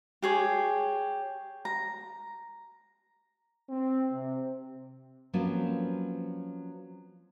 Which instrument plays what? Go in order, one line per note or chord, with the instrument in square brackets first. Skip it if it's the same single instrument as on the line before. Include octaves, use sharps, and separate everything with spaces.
[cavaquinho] G4 G#4 C#5
A#5
[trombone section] C4
C3
[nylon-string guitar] F3 F#3 A#3 C4 C#4 B4